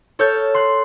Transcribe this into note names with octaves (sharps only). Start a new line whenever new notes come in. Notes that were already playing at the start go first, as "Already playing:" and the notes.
A4 C#5 E6 F6 G6 A6
C6 F#6